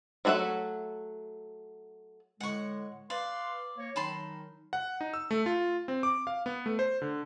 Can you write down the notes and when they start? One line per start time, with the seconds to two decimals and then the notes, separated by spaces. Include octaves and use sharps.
0.25 F#3 A3 F#4 C#5 E5
2.40 A2 D3 G#3 F#5 C#6
3.10 B4 D5 F5 C6
3.78 A#3 C#5
3.96 D#3 F#3 D#4 A5 B5 C6
4.73 F#5
5.01 D#4
5.14 E6
5.31 A3
5.46 F4
5.88 C4
6.03 D6
6.27 F5
6.46 B3
6.66 A3
6.79 C5
7.02 D3